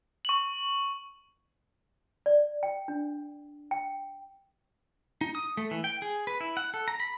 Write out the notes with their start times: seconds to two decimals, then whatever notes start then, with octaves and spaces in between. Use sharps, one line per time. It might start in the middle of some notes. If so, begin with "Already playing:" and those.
0.25 C#6 F#7
2.26 D5
2.63 G5
2.88 D4
3.71 G5
5.21 D#4
5.35 D#6
5.57 A3
5.71 E3
5.84 G5
6.02 G#4
6.27 B4
6.41 E4
6.57 F#5
6.74 A4
6.88 A#5
7.00 B5